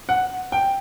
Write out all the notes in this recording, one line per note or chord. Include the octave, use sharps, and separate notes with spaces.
F#5
G5